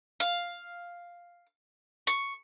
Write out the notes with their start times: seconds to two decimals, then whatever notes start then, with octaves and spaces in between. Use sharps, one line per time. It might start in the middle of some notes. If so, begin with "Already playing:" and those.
0.20 F5
2.07 C#6